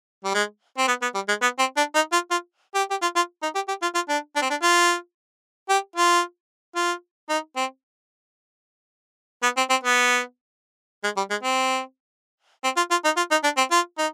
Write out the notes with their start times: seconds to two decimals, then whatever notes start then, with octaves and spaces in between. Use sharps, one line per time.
0.24 G3
0.34 G#3
0.78 C4
0.88 B3
1.02 B3
1.15 G3
1.28 G#3
1.42 B3
1.59 C4
1.77 D4
1.95 D#4
2.12 F4
2.31 F4
2.75 G4
2.91 G4
3.02 F4
3.16 F4
3.42 D#4
3.55 G4
3.68 G4
3.82 F4
3.95 F4
4.09 D4
4.36 D4
4.42 C4
4.50 D4
4.62 F4
5.69 G4
5.96 F4
6.76 F4
7.29 D#4
7.56 C4
9.43 B3
9.57 C4
9.70 C4
9.83 B3
11.04 G#3
11.17 G3
11.30 G#3
11.43 C4
12.64 C4
12.77 F4
12.91 F4
13.04 D#4
13.17 F4
13.31 D#4
13.43 D4
13.57 C4
13.71 F4
13.98 D#4